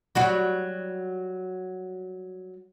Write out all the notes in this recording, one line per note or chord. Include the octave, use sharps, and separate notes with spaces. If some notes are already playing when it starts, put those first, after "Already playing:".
F#3 G3 F#4